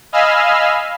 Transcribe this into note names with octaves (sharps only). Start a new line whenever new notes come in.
D#5 F5 G#5 B5 E6 F6